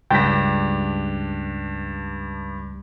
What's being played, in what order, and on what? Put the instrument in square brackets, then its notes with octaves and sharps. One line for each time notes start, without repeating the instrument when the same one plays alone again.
[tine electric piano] C#2 G3 A#6 [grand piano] G2 D4 B6 [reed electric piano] G5